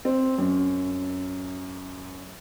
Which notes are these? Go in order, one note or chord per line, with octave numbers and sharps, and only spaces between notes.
C4
F#2